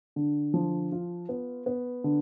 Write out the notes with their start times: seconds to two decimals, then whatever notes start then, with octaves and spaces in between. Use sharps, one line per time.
0.16 D3
0.54 F3
0.92 F4
1.29 B3
1.66 B3
2.04 D3